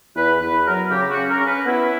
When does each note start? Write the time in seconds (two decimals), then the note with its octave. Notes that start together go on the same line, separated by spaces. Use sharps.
0.16 E2 B4
0.40 E2 B4
0.65 F#3 A#4
0.90 C#3 G4
1.10 F#4
1.15 C#4
1.28 A#4
1.40 C#4
1.47 B4
1.65 B3 E4